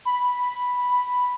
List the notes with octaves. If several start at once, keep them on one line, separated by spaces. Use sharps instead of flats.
B5